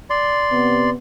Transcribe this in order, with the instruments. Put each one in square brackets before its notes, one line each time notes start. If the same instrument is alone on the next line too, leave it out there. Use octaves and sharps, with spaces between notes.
[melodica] D5 C6
[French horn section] C3 B3